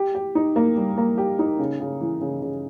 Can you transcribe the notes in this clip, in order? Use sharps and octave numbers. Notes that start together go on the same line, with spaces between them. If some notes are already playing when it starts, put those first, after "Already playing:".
Already playing: G4
G4
D#4
A#3
G3
A#3
G4
D#4
C#3
C#3
E3
C#3
C#3